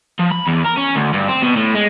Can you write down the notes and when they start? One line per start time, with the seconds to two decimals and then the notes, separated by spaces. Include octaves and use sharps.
0.19 F3
0.32 B5
0.48 E2
0.66 A#4
0.78 C#4
0.96 D2
1.14 G2
1.28 C4
1.42 B2
1.56 A2
1.75 G#3